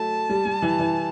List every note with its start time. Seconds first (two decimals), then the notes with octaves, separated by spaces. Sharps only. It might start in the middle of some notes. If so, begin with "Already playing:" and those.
Already playing: F#3 A3 A5
0.30 G3
0.45 G3
0.62 E3
0.79 E3